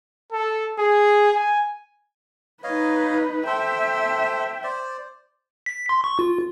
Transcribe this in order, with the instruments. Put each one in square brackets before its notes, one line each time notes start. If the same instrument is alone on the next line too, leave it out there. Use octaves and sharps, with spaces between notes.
[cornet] A4
G#4
G#5
[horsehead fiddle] D#4 B4 [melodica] C#5 D#5 F5
[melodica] A4 C5 [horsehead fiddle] E5 G5
[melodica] C5 D5
[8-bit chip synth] B6
C6
C#6
F4